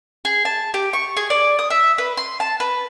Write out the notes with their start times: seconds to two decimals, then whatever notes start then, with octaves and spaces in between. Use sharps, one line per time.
0.25 G#4
0.45 A5
0.74 G4
0.93 C#6
1.17 G#4
1.30 D5
1.59 D#6
1.70 E5
1.98 B4
2.17 C6
2.40 A5
2.60 B4